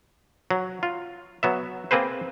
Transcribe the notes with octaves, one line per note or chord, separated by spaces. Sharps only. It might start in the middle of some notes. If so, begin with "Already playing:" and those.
F#3
F4
F#3 B3 E5
A#3 C4 G#4 B4 C5